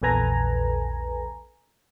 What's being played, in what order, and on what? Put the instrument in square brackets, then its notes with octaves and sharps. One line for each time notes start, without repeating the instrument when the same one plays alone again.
[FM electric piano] A#1 E2 A4 B4 G#5 A#5